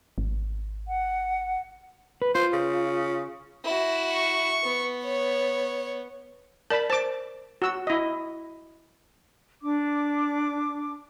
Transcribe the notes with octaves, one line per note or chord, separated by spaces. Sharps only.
G#1
F#5
B4
F4 C5
C#3
E4 F#4
C#6
B3
C#5
A#4 D5 A5 B5
C5 A5 D6
F#4 E6
E4 D#5
D4 D6